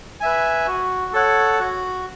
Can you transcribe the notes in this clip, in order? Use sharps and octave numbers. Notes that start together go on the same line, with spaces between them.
B4 E5 G#5
F#4
A4 C#5 F#5
F#4